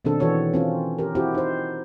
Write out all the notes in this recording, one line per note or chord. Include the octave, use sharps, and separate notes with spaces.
B2 D#3 C4 D4 A4
E3 F#4 A4 C#5
C4 C#4 F4
G4 A#4
C4 E4 F#4 G4
D#4 C5